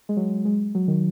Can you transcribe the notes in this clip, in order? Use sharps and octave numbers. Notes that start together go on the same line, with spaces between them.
G#3
F#3
G#3
F#3
D#3